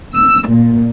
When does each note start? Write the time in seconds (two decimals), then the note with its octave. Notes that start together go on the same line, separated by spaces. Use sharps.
0.14 E6
0.49 A#2